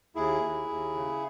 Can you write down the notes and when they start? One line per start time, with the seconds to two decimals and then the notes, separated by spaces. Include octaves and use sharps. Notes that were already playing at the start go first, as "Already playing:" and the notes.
0.15 D#2 E4 G#4
0.42 D#2
0.68 D#2
0.94 C#3